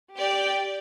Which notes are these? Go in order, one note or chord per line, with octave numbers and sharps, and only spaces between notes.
G4 D5 G5